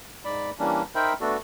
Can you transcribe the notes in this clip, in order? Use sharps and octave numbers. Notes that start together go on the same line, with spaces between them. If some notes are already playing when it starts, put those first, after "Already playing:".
G#2 D5 B5
E3 G3 A#3 C#4 D4
D#4 A#4 C5 E5 G5 B5
A3 B3 D4 F#4 A4